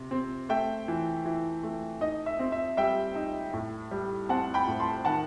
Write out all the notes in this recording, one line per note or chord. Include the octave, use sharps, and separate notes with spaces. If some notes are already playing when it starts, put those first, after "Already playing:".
Already playing: C3
C4
A3 E5 G5
E3
E3
A3
D#4 D#5
E5
C4
E5
G3 E5 G5
D#4
A2
G3
C4 F#5 A5
G5 B5
A2
A5 C6
D#3 F#5 A5